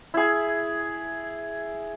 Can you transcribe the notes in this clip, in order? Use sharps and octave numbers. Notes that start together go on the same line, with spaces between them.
E4 G#4